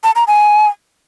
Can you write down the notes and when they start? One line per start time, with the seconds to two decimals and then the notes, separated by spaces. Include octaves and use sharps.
0.04 A5
0.16 A#5
0.27 G#5